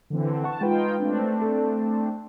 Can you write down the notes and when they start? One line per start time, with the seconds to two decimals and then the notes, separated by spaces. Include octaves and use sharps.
0.10 D3 E3 C4
0.44 F#5 A5 C#6
0.61 G#3 D#4 F4 B4 G5
0.99 A3 C4 D4
1.42 A4